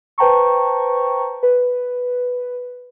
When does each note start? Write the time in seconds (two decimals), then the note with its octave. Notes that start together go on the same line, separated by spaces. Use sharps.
0.18 B4 C5 G5 A5 A#5 C#6
1.43 B4